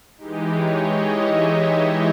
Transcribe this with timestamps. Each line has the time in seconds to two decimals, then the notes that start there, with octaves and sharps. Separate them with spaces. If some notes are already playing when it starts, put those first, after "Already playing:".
0.18 E3 G#3 D#4 G4
0.53 C#5
0.86 D#5
1.20 E5